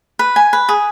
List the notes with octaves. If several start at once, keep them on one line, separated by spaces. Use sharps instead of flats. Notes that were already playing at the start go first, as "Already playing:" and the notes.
B4
G#5
B4
G#4